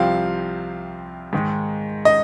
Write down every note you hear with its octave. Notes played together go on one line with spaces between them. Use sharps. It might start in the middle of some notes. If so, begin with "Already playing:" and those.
Already playing: C2 C3 F3 C4 F5
G#2 D#3 G#3
D#5